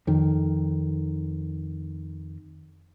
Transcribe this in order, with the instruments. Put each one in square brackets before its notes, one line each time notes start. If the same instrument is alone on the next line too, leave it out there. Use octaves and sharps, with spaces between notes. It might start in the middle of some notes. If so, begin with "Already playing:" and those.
[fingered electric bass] F2 D#3